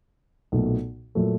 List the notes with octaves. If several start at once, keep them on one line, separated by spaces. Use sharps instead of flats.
B1 A#2 F#3 A3
A#2 F#3 A3